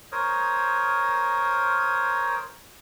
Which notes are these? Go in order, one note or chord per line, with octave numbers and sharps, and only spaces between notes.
A#4 C5 C#5 D#6